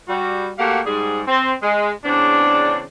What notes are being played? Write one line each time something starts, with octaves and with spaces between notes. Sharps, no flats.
G3 F#4
A3 A#3 F#4 G4 F5 F#5
G#2 G3 G#4
C4
G#3
E2 C#3 C4 D4